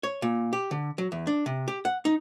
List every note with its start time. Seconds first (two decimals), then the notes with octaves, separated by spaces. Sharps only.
0.03 C#5
0.22 A#2
0.53 G4
0.71 D3
0.98 F#3
1.12 E2
1.27 D4
1.46 C3
1.68 G4
1.85 F#5
2.05 D#4